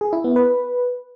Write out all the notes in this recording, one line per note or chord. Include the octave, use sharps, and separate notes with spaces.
G#4
E4
B3
B4